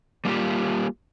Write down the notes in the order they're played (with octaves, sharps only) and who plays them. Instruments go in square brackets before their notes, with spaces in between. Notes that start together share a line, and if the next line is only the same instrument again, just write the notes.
[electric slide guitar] G3 A#3 F4 G4